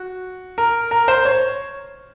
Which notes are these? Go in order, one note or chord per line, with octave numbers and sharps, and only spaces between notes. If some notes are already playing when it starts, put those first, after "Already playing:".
Already playing: F#4
A#4
A#4
C5
C#5